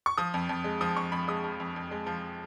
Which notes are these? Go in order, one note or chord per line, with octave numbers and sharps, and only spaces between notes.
C#6
F3 D#6
F2
F2
G#3
F3 D#6
F2 C#6
F2 B5
G#3 D#6
F3
F2
F2
G#3
F3